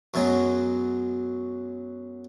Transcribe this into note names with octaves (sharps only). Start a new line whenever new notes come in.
F#2 B2 F#3 G#3